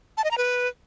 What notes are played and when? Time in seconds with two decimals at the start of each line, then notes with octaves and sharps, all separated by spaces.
0.17 A5
0.24 D#5
0.31 A#5
0.38 B4